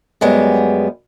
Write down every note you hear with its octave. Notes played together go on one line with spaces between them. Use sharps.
F#2 G3 G#3 B3